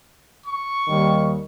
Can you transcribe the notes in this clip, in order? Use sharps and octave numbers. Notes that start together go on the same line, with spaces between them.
C#6
D#2 D#3 G3